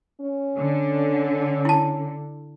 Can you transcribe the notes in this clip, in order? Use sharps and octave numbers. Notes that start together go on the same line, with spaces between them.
C#4
D3
E4 A5